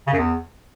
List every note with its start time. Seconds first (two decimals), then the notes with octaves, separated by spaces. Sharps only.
0.07 C#3
0.13 F#2
0.18 E2